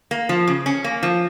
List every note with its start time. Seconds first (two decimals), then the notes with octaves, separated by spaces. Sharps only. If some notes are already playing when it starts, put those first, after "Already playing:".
0.11 A#3
0.29 F3
0.48 C#3
0.66 C#4
0.84 A#3
1.03 F3